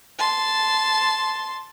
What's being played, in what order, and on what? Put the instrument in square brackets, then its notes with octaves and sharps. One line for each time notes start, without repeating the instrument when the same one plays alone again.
[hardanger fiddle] A5 C6